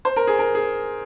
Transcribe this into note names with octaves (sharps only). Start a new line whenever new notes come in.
C5
A#4
G#4
A#4
G#4